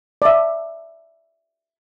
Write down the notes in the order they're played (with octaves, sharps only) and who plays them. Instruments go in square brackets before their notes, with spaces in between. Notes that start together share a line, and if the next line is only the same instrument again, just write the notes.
[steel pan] D5 E5